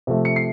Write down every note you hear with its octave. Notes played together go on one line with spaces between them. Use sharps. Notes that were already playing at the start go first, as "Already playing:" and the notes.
C3 F3 A3
C#7
C7